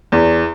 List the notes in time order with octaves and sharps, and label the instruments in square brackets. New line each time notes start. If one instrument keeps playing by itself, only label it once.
[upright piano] E2